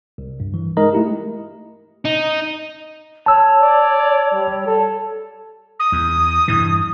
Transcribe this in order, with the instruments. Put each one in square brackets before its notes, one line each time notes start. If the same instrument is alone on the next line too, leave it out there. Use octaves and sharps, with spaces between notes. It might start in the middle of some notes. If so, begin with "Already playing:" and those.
[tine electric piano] C2
G2
E3
G#3 D#4 A#4 D#5 A#5
A3 E4 G4
[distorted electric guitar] D#4
[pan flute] C#5 [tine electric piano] A5 E6
[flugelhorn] D5
G3
A4
[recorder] D#6
[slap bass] E2
G2 E3